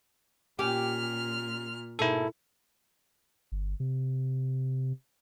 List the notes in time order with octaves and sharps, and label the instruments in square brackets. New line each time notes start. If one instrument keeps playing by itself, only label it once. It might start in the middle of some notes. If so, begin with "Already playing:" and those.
[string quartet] A#2 F6 [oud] C#4 G4
[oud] G#2 B2 A#3 [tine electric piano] E4 A4
[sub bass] G1
C3